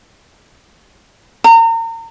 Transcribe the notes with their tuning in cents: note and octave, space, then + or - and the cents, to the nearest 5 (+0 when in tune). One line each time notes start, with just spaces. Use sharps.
A#5 -35